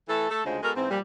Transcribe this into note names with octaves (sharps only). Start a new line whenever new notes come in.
E3 A3 A4
A3 A4
D2 C#3 G#3 F4 C5
G#3 B3 F#4 A4 A#4
G#2 E3 C4
A#2 F3 G3